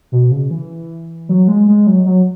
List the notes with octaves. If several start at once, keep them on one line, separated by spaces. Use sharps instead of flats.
B2
C#3
E3
F#3
G#3
G#3
F#3
F#3